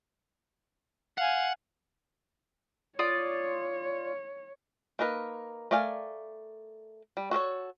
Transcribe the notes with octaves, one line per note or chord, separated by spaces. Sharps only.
F5 F#5 G#5
F4 C#5 D5 D#6
A#3 D#4 A#4 B4
A3 A#4 D5 F5 G#5
G3
F#4 A4 A#4 C#5